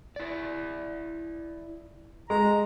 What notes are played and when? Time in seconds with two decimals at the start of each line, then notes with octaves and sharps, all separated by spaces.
0.16 E4 D5
2.30 G#3 A#5